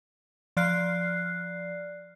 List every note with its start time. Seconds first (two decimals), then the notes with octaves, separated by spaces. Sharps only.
0.57 F3 D5 F6 F#6 C7